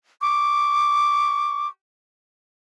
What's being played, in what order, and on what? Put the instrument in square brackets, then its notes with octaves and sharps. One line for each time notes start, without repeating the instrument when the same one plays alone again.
[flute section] C#6 D6